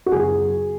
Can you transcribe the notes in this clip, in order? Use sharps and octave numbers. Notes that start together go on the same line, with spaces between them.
F#4
F#2 C#3 F#3 B3 G#4